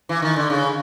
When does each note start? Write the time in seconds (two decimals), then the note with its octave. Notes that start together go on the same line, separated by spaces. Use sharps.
0.09 E3
0.22 D#3
0.37 D3
0.50 C#3